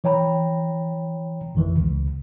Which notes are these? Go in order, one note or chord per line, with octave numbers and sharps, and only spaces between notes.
E3 C#5 G5 A#5 B5
A1 F2 D#3 E3
C#2 C#3